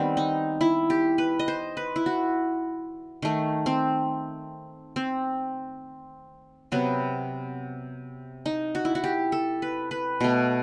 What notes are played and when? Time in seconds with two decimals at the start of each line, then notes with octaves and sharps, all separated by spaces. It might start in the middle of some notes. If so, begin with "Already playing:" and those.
Already playing: D#3 G3 B3 C4
0.17 D#4
0.61 E4
0.90 G4
1.18 B4
1.39 D#5
1.48 C5
1.77 B4
1.96 E4
2.06 F#4
3.22 D#3 A3
3.66 C4
4.96 C4
6.72 C3 F#3 B3
8.46 D#4
8.75 F#4
8.85 E4
8.95 F#4
9.04 G4
9.32 A4
9.62 B4
9.91 B4
10.21 B2 A3